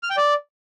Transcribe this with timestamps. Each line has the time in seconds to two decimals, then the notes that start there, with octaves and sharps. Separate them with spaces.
0.03 F6
0.10 G5
0.17 D5